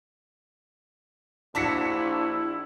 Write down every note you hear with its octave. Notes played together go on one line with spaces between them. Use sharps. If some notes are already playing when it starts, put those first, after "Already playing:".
A#1 D4 E4 F#4 C#5 A5 B6 C#7